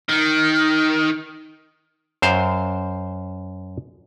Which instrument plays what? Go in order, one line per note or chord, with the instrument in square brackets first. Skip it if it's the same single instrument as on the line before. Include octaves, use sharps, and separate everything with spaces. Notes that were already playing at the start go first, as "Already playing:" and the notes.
[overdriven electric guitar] D#3
[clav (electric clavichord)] F#2 C5 F5